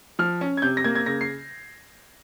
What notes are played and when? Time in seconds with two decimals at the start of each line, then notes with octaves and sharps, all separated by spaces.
0.19 F3 F6
0.41 C#4
0.57 G#6
0.62 C3 G6
0.77 A#6
0.84 A#3 G#6
0.95 G#6
1.06 C#3 A#6
1.21 C7